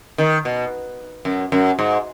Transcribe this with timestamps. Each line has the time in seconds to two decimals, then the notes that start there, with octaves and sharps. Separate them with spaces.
0.18 D#3
0.45 B2
1.25 F#2
1.52 F#2
1.79 G#2